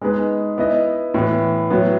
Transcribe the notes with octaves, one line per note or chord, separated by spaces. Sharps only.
G#3 B3 D#4 G#4 B4
B3 E4 B4 D#5
A2 E3 B3
A2 F#3 B3